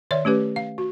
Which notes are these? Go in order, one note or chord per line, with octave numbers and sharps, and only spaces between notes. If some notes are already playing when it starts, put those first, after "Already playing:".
D#3 C#5 D5 E5
A3 C#4 G4 B4
F5
F#4